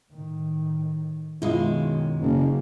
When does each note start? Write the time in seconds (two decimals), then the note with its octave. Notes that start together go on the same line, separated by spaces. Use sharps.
0.11 A2 D#3
1.42 F#2 B2 D#3 G#3 E4 F4 D#6
2.21 F#1 C#3 A#3